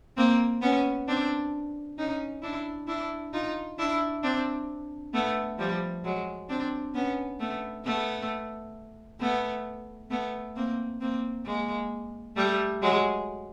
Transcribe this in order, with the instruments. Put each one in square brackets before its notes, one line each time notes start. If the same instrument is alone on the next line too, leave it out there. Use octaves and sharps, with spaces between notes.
[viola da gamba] A#3 C4
B3 C#4
C4 D4
C#4 D#4
D4 E4
D4 E4
D#4 F4
D4 E4
C4 D4
A3 B3
F3 G3
F#3 G#3
C4 D4
B3 C#4
A3 B3
A3 B3
A3 B3
A3 B3
A#3 C4
A#3 C4
G#3 A#3
G3 A3
F#3 G#3